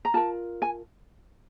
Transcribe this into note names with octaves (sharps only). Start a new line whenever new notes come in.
A#5
F4 A#4 A5
G#5